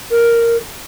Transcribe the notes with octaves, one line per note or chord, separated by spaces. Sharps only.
A#4